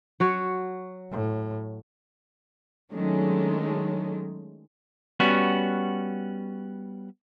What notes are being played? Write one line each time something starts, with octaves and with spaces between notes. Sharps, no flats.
F#3 F#4 C#5
A2
D#3 F#3 G#3 A3 C#4 D4
G3 B3 C#4 F#4